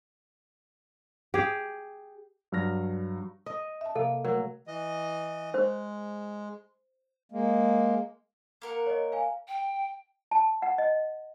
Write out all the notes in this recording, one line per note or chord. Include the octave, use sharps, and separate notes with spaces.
G4 G#4
G2 F#3 F6 A#6
D#5
E5 A5
C3 A#3 A4
F#3 A3 A#4
E3 D#5
G#3 C5
G#3 A#3
A#3 A#4 F#5
C#5 D#5
F5 G#5
G5
A5
F#5
D#5